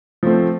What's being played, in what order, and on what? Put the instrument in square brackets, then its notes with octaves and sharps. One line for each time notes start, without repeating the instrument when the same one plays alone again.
[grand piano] F3 A3 C4